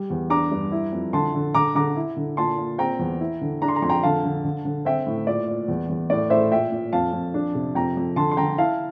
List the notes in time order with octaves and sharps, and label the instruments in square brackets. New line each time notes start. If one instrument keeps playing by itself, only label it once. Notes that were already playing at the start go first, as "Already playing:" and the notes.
Already playing: [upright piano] G3
E2
D4 A#5 D6
G2
E4
F2
D3 A5 C6
D3
D3 A#5 D6
D3 A#5 D6
E4
D3
A#2 A5 C6
A#2
C4 G5 A#5
E2
E4
D3
D4 A#5
C6
A#5
F2 C6
G5 A#5
D3 F5 A5
D3
D3
D3
C4 E5 G5
A2
A#2 D5
A#2
E2
E2
A2 D5
A2 C5 E5
A#2 E5 G5
A#2
F2 F5 A5
F2
D4
C3
F2 G5 A#5
F2
D3 A5 C6
C6
D3 G5 A#5
E4 F5 A5